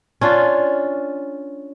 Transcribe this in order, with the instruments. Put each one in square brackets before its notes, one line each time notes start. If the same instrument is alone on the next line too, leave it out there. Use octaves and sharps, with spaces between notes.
[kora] C#4 D4 F4